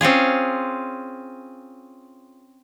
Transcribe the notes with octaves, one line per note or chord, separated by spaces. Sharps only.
C4 C#4 F4 G#4